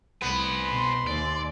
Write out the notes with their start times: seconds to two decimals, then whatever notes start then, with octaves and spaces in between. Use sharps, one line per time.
0.22 C2 B3 C5 G#5
0.70 B2 C6
1.07 D#2 D5